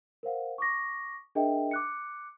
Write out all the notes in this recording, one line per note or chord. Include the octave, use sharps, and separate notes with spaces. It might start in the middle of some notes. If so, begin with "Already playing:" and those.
A#4 C5 F5 F#5
C#6 D6 A#6
D4 G#4 A#4 D#5 E5 G5
D6 F#6 C#7